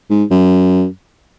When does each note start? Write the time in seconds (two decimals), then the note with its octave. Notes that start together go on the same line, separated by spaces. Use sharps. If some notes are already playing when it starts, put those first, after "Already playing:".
0.10 G#2
0.31 F#2